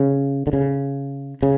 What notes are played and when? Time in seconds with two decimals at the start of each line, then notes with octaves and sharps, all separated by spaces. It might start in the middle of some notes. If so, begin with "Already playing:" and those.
Already playing: C#3
0.47 D3
0.53 C#3
1.43 C#3